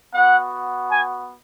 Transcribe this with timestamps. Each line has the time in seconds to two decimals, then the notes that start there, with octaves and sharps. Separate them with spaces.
0.14 B3 F#4 F#5
0.90 G#5